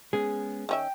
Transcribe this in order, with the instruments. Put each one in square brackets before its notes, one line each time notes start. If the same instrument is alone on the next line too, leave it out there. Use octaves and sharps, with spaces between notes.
[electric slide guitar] G#3 B3 C#4 [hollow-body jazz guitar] G#4
[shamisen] D#3 C#4 E5 [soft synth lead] G5